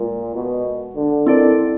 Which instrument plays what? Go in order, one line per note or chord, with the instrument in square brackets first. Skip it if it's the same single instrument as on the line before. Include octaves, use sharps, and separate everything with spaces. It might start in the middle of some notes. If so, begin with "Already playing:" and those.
Already playing: [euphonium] A#2 [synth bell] G#3
[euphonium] B2
D3
[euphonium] D#3 [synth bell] C4 E4 A4 D5